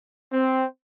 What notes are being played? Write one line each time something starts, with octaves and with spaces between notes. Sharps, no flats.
C4